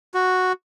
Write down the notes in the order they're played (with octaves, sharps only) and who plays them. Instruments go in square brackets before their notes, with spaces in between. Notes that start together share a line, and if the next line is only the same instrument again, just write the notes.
[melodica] F#4